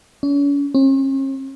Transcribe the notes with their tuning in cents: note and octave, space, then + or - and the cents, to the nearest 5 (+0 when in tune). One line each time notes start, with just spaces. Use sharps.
C#4 +40
C#4 -45